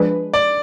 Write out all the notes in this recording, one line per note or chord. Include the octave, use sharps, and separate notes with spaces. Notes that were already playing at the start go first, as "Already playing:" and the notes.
Already playing: F3 G#3 D4 G#4 B4
D5